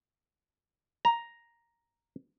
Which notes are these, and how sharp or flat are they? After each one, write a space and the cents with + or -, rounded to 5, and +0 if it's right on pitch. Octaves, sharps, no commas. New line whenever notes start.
A#5 +5